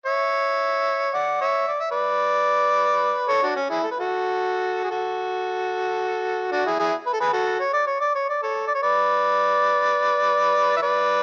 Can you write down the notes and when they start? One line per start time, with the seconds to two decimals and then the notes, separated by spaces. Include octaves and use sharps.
0.06 C#5 E5
1.14 D5 F#5
1.41 C#5 E5
1.68 D5
1.80 E5
1.90 B4 D5
3.29 A4 C#5
3.42 D4 F#4
3.56 C#4
3.70 E4 G#4
3.83 A4
3.91 B4
4.00 F#4 A4
4.84 G#4
4.90 F#4 A4
6.52 D4 F#4
6.66 E4 G#4
6.79 E4 G#4
7.06 B4
7.13 A4
7.20 G#4 B4
7.33 F#4 A4
7.60 C#5
7.73 D5
7.87 C#5
8.01 D5
8.15 C#5
8.29 D5
8.43 A4 C#5
8.67 D5
8.74 C#5
8.82 B4 D5
10.77 E5
10.82 B4 D5